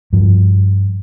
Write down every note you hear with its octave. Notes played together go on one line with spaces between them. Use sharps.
G2 F3